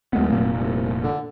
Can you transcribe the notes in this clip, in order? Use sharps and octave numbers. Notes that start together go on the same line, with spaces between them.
D1 D#2 G#3 B3
F1 A#2 A#3
C2
D3